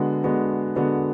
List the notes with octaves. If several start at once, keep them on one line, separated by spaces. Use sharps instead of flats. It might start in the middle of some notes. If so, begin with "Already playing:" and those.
Already playing: D3 G#3 B3 F#4
D3 G#3 B3 F#4
D3 G#3 B3 F#4